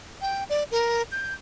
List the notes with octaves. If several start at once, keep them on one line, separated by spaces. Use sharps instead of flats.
G5
D5
A#4
G6